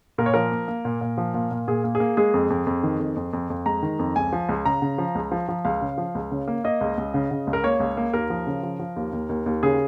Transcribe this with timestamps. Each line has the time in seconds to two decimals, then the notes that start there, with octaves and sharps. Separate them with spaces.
0.18 A#2 A#4
0.26 C#5
0.34 F3 A#4
0.51 A#3
0.68 A#3
0.85 A#2
1.01 A#2
1.18 F3
1.34 A#2
1.51 A#2
1.68 A#2 G#4
1.84 A#3
1.95 G#4
2.00 A#3
2.17 G#3 G#4
2.34 F2
2.50 F2
2.67 F2
2.83 D#3
2.99 F2
3.16 F2
3.33 F2
3.50 F2
3.66 G#3 A#5
3.83 D#3
3.99 F2
4.16 C#2 G#5
4.33 F3
4.49 C#2
4.65 C#3 A#5
4.82 C#3
4.98 F3
5.15 C#2
5.31 F3
5.49 F3
5.65 C#2 F5
5.81 C#3
5.98 F3
6.15 C#2
6.31 C#3
6.48 A#3
6.64 A#3 D#5
6.81 C#2
6.98 C#2
7.14 C#3
7.31 C#3
7.47 C#2
7.53 A#4
7.64 A#3 C#5
7.80 C#2
7.97 A#3
8.13 D#2 A#4
8.30 F3
8.47 C#3
8.63 F3
8.79 F3
8.96 D#2
9.13 D#2
9.29 D#2
9.46 D#2
9.63 C#3 G#4